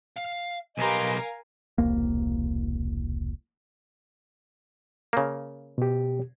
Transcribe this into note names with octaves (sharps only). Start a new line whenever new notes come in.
F5
B1 G4 A#4 B4 D#5 F5 G#5 C6
E1 C2 A#3
C#3 A#3
B2 G4